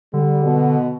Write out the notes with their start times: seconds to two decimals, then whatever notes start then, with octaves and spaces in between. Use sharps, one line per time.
0.14 D3 G3
0.44 B2